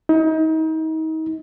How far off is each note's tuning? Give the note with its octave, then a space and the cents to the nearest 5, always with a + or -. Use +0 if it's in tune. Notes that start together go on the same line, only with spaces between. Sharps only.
D#4 +35